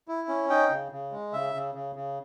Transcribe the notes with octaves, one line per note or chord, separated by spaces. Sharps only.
E4
C#4
D#4 G5
C#3
C#3
G#3
C#3 E5
C#3
C#3
C#3